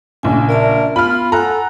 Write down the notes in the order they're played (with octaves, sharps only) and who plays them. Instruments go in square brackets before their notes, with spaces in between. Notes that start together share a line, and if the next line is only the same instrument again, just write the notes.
[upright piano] A#1 C#3 [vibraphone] G#5
[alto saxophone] A#4 [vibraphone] D5 E5 A5
[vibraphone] B3 [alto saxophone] F4 [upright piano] B5 F6
[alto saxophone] A4 [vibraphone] F#5 G#5 [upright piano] A#5 F#6